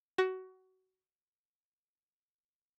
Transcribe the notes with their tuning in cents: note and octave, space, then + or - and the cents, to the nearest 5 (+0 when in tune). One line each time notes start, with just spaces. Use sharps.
F#4 +20